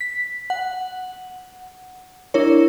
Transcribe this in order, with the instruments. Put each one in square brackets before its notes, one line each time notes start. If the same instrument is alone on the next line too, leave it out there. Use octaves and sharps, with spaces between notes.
[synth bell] B6
F#5
D4 E4 A#4 C#5